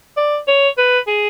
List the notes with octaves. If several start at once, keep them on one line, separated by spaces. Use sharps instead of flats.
D5
C#5
B4
G#4